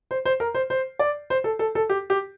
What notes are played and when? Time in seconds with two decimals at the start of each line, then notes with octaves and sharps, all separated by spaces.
0.11 C5
0.25 C5
0.40 A#4
0.55 C5
0.70 C5
0.99 D5
1.30 C5
1.44 A4
1.59 A4
1.75 A4
1.90 G4
2.10 G4